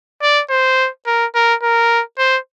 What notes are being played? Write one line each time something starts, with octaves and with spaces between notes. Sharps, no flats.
D5
C5
A#4
A#4
A#4
C5